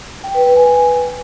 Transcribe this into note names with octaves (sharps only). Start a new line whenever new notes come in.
G5
B4
B4
G#5